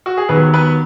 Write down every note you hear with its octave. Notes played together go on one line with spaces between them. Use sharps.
F#4
G#4
D#2 D#3 F#3 B3 B4
B3 B4